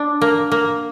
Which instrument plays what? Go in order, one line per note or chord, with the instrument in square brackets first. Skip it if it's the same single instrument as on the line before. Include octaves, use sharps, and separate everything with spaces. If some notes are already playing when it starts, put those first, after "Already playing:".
Already playing: [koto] D4
A#3
A#3